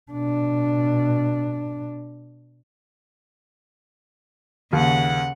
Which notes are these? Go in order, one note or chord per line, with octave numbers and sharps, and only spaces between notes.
B2 D4
D#2 C#3 F#5